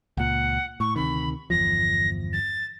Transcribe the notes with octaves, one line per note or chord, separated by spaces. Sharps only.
C#2 A#2 F#5
A2 C#6
D2 C3 D#3 B5
G1 E2 F3 A#6
A6